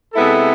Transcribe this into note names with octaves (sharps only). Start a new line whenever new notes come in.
C3 G#3 B3 E4 A4